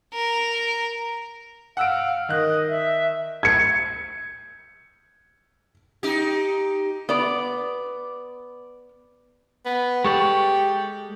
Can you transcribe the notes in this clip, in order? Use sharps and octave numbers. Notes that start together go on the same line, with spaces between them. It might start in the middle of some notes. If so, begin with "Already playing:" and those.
A#4
F5 F#5 E6 D7
D#3 D#5 F#6
E5
G#6 C#7
D#4 G4
B3 D5
B3
G#3 G4 A4 D5 C#6